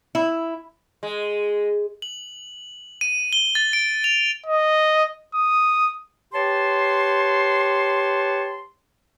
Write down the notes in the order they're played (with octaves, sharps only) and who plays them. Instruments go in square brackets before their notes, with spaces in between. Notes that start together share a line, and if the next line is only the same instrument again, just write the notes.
[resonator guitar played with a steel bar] E4
[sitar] G#3
[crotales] F#7
D#7
G7
A6
D7
F7
[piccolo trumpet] D#5
D#6
[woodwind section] G4 B4 C#5 A5 C6